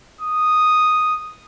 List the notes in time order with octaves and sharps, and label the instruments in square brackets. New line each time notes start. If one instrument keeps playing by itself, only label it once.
[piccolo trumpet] D#6